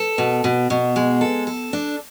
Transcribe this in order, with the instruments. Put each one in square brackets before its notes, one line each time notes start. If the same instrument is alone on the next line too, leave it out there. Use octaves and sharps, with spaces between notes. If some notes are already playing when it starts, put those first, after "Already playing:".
Already playing: [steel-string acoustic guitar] A4
B2
B2
B2
G#3
A4
A4
D4